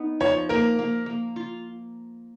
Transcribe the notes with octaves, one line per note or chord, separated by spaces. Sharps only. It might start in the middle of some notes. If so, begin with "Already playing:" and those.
Already playing: B3 D#4
F3 C#5
A#3 A#4
A#3
A#3
F4